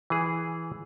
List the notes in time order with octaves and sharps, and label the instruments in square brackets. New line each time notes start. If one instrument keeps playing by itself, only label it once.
[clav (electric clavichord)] E3 G#4